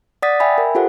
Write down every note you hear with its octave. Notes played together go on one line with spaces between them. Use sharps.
D5 F#5 D#6 A6 B6
E5 G5 G#5 B5
A#4
F4 G4 A4 C5 F#5